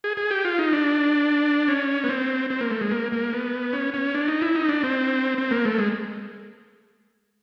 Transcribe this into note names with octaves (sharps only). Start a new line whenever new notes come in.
G#4
G#4
G4
F4
D#4
D4
C#4
B3
C4
C4
A#3
A3
G#3
A#3
A#3
B3
C#4
C#4
D4
D#4
E4
D#4
D4
C4
C4
A#3
A3
G#3